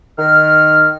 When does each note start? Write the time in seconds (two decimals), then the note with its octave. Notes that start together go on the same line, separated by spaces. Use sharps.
0.19 D#3 F6